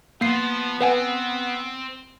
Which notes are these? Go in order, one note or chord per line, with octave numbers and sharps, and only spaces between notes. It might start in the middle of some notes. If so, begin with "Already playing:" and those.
F3 A#3 B3 C7
C4 B4 F#5 G#5